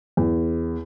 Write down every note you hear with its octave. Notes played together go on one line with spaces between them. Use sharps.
E2